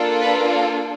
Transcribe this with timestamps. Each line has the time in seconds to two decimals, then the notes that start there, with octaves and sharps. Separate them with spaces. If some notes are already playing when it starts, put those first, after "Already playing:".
Already playing: A#3 D4 F4 A4
0.21 B4